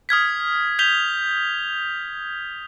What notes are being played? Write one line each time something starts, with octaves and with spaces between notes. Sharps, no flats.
D#6 F6 G#6 B6
G6 B6 F7 G7